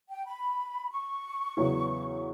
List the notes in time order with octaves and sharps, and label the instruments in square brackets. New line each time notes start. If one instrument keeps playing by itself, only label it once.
[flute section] G5
B5
C#6
[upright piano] E2 C#3 F#3 B3 E4